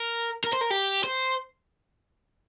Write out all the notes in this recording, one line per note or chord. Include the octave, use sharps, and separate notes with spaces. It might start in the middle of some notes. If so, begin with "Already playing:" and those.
Already playing: A#4
A#4
C5
A#4
G4
C5